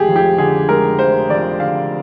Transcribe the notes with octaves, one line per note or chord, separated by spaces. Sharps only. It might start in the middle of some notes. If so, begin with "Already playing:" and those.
Already playing: F1 G#3 G4 G#4
F2
G4
D3 G#4
G#3 A#4
F1 C5
F2 D5
D3 F5